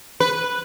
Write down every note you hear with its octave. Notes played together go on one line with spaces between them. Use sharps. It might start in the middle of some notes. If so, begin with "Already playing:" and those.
B4